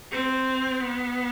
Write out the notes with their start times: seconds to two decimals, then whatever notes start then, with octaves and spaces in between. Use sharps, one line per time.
0.11 C4
0.81 B3